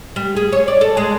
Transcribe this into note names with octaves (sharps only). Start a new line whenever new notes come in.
G3
G#4
C#5
D5
A4
G#3